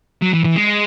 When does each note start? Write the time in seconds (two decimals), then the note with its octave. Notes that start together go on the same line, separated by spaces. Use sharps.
0.22 F#3
0.33 E3
0.44 E3
0.56 G#3